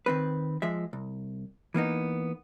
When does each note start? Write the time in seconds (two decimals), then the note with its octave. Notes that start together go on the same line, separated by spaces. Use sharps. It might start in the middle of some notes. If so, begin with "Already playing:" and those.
0.06 D#3 C4 B4
0.62 F3 G#3 E5
0.93 C2
1.74 E3 A#3 B3 D#4